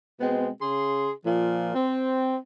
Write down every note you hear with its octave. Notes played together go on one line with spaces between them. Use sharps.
B2 G#3 B3 C4
C#3 G#4 C6
A#2 F3
C4